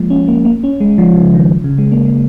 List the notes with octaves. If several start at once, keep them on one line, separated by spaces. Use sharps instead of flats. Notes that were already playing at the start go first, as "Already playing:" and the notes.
Already playing: F3 G#3 A#3
C#4
A#3
A#3
C#4
G#3
F3
C#3
D#3
C#3
G#3
A#3
G#3